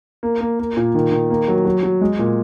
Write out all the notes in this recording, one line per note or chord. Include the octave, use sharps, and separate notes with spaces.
A#3
A#3
A#3
A#2
D#3
D#3
A#3
F#3
F#3
F#3
G#3
A#2